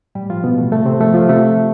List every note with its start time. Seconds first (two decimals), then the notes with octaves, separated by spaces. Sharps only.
0.15 A2 G3 G4
0.30 F3 F4
0.44 B2 E3 B3
0.58 A3
0.72 C3 A3
0.86 C3 C4
1.00 F3 A3
1.14 F3 F4
1.29 C3 A3 A4
1.57 F3